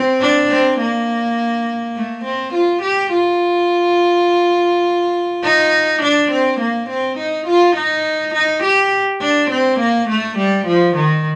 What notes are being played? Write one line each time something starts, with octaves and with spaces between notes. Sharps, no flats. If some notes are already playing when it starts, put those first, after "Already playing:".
Already playing: C4
D4
C4
A#3
A3
C4
F4
G4
F4
D#4
D4
C4
A#3
C4
D#4
F4
D#4
D#4
G4
D4
C4
A#3
A3
G3
F3
D#3